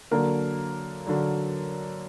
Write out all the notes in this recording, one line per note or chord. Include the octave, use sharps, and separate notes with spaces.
D3 F#3 A#3 A#4
D3 F#3